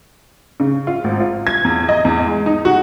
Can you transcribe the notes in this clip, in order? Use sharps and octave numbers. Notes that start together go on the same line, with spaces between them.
C#3
F4
G#1
F4
G#6
E2
D#5
E2
G#3
D#4
F#4